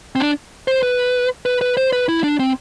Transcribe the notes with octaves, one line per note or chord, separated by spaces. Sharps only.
C4
D4
C5
B4
B4
B4
C5
B4
E4
D4
C4